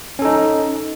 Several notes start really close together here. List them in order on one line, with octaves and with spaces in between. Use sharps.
C#4 A4 D#4